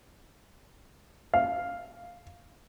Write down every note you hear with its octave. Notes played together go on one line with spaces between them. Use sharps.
F5